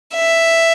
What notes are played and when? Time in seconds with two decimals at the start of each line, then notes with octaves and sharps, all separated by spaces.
0.15 E5